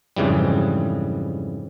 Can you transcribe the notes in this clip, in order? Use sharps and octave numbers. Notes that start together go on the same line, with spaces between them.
F2 G#2 C#3 E3 G3